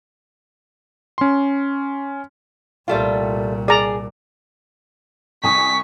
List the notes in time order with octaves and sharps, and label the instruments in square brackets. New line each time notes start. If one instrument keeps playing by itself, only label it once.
[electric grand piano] C#4 C6
[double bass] C2 A#2 [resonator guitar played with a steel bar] G3 A3 F4
[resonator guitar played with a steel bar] G#4 [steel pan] D5 A#5
[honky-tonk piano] C2 G#5 D#6 [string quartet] C#6 [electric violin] B6